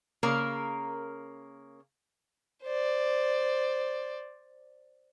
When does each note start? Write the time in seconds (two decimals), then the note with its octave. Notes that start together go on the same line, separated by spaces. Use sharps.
0.23 C#3 A#3 A#4
2.63 C5 D5